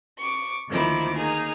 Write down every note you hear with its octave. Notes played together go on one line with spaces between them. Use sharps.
C#6 D6
D2 D#3 F3 A#3 E4 D6
A#3 D#4 G#4 A#5